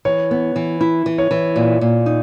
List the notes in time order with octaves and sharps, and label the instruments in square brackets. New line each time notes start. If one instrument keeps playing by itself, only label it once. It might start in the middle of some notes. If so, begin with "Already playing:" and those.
[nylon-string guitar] E3 [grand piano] C#5
[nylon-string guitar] B3
E3
E4
E3
[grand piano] C#5
[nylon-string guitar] E3
A#2
A#2
D#4